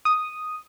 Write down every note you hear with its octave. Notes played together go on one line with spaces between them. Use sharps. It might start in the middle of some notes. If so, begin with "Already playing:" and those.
D#6